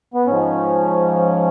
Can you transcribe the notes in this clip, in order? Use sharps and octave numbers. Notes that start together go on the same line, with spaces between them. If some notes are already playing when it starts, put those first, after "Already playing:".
B3
G#2 F3 C#4